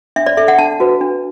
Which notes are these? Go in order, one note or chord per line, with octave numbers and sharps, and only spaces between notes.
D4 E5
D5
A4 E5
F#5
D4 A5
F#4 B4
D4